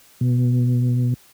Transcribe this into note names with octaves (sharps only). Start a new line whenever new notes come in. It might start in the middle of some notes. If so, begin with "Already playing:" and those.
B2